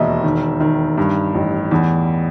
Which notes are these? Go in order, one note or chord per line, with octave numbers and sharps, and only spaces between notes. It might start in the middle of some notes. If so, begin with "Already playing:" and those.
Already playing: E1 D#2 D#5 E5
D#3
D#3
G2
A1
E2